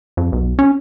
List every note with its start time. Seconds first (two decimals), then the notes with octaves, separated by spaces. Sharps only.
0.17 F2
0.32 B1
0.59 C#4